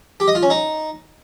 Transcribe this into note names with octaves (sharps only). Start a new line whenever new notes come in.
G4
D#5
F4
C#4
D#4